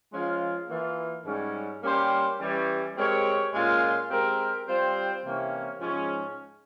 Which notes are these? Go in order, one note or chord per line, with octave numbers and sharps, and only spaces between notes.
F3 G#3 C#4 F4
E3 A#3 F4
G#2 G3 C#4
G3 A#3 C#4 G4 C5
E3 G3 C#4
G#3 C4 G4 A#4 C#5
A#2 G#3 C#4 F4
G#3 C4 G4 A#4
G3 C4 F4 C5
C3 E3 A#3 C#4
G#2 F3 G#3 C#4